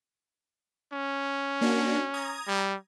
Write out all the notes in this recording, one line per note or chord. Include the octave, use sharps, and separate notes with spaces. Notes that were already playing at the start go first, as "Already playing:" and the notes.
C#4
A#3 D4 F#4
A#5 D#6 G#6
G3